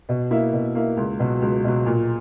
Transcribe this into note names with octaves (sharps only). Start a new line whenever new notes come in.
B2
A#3 E4
B2
A#3 E4
C#2
B2 F#3
C#2
B2 F#3
A#2